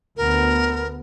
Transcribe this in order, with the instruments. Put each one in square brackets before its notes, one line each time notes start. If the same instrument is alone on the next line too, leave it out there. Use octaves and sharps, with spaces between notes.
[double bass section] D2 B3 [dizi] A#4